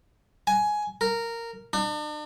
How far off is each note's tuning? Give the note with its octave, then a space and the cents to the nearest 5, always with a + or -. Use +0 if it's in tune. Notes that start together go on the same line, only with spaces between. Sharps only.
G#5 +15
A#4 -10
D4 +45